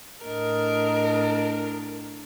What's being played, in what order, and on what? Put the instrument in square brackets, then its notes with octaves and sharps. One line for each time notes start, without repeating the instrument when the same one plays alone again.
[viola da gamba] A2 D4 [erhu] A#4 [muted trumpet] D#5